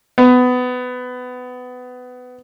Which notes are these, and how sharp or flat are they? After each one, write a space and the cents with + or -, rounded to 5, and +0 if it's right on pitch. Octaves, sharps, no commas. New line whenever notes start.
B3 +20